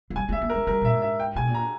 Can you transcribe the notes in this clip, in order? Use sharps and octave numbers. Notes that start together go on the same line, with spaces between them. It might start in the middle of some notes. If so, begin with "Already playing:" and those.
E3
G3 G#5
G#3 E5
A#3
A#4
G#3
G3 A#4
A#2 E5
G#2
E5
G5
B2 G#5
A#2
A#5